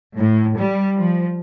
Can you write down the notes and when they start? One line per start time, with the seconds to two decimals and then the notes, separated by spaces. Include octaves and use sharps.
0.16 A2
0.56 G3
0.96 F3